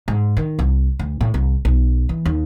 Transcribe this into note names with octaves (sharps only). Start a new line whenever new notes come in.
G#2
D#3
C2
D2
A2
C2
B1
E3
D#2